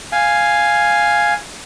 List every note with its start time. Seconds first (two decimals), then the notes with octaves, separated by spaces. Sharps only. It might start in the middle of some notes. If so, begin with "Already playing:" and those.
0.12 F5 G#5